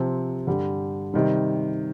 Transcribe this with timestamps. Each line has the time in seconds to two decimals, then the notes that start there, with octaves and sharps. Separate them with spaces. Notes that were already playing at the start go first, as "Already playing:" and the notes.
Already playing: C3 F3 C4
0.47 G2 D3 G3
1.14 C3 D#3 G3